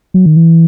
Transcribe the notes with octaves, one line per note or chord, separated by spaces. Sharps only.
F#3
D#3
E3